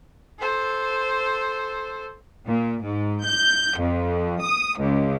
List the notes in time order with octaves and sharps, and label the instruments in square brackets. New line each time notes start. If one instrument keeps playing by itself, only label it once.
[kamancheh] A4 C5
[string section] A#2
G#2
G6
F2
D#6
C#2